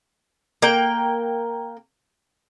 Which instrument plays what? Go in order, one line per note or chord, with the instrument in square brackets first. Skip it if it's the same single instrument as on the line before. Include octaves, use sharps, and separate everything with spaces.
[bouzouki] A#3 G5